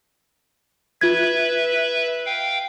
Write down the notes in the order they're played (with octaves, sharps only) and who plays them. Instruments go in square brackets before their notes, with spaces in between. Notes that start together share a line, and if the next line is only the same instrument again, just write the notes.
[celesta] F4 G#6 [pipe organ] B4 E5
[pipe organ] F5 G5